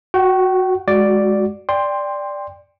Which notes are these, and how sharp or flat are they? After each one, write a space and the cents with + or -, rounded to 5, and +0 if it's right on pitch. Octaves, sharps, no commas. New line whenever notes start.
F#4 -10 G5 -40
G#3 +5 F#4 +0 D5 +0
D5 +0 G5 +20 C6 +0